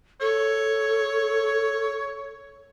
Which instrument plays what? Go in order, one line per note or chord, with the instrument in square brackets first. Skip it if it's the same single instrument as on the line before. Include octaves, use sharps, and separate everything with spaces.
[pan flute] A4 [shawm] C#5